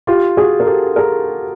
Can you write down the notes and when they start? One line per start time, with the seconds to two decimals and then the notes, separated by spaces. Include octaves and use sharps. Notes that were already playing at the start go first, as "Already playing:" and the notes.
0.07 F4 G4
0.37 F#4 G#4
0.60 A#4
0.66 G4 A4
0.96 G#4 A#4